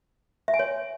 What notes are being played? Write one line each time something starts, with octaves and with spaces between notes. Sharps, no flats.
E5
G#5
C#5